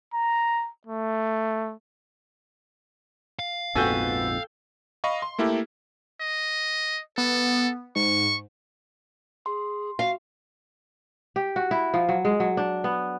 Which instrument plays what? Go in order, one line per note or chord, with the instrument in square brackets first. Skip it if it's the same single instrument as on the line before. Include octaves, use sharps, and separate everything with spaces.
[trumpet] A#5
A3
[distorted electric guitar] F5
[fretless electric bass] A#1 F2 G#2 [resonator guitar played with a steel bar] B3 F#4 G#5 [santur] A4 G5
[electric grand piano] D#5 F5 B5 C#6
C6
A3 A#3 E4 G4 A4
[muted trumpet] D#5
[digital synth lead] B3 [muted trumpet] A4
[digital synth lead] G#2 [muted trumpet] C#6
[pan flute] G#4 [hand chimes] C6
[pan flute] F#4 [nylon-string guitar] F5
[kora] G4
F#4
E4
F3
F#3
G#3
F#3
D4
B3